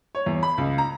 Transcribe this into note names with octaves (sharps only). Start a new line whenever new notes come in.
C#5
E2
B5
C#2
A#5